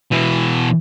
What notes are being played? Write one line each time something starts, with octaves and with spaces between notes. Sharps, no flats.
B2 E3